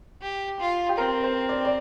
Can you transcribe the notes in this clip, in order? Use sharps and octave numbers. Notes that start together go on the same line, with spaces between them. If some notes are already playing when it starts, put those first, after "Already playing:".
G4
F4
G4
C4 A#4
C5
D5
D5